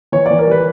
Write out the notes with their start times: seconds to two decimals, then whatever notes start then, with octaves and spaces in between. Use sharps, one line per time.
0.12 E3 C#5
0.26 E3 D5
0.39 A#4
0.47 G3 B4